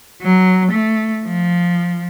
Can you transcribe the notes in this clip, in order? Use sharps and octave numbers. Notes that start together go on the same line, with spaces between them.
F#3
A3
F3